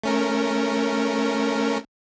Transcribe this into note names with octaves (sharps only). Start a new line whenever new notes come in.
A3 C#4 A#4